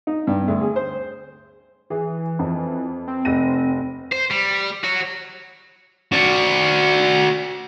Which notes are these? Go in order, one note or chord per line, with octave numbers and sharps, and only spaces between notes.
D#4
G2
D2
G#4
C5
E3 G#4
F2
C4
F1 A#6 D#7
C5
G3
F#4 C#5
F#4 D5